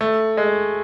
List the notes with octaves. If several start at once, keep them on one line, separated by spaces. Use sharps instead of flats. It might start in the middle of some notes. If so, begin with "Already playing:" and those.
A3
G#3